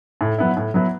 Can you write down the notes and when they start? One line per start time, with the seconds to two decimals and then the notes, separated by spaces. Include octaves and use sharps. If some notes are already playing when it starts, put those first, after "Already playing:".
0.21 A2
0.38 F#3 B3 E4
0.57 A2
0.74 F#3 B3 E4